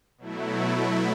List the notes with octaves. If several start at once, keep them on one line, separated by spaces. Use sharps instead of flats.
B2 F#3 A3 E4